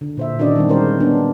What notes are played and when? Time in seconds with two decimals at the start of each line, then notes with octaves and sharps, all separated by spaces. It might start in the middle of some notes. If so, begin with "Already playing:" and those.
0.01 D3
0.17 A#2 C5 E5
0.39 D#3 C#4 D4 F#4 D5 D#5
0.55 D#3 G3 C4
0.69 G#3 C#4 F#4 A#4 C5
1.00 B3 D4